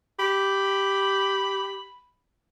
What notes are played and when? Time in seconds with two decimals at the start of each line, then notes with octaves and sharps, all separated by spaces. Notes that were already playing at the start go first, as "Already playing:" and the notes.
0.19 G4 B5